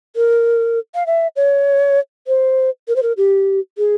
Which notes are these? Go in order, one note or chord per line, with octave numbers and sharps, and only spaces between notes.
A#4
F5
E5
C#5
C5
A#4
C5
A#4
G4
G#4